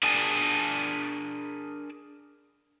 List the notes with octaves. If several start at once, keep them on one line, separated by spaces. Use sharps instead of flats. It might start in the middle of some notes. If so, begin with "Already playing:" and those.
D4 G#4 A#4 D5 G#5 A5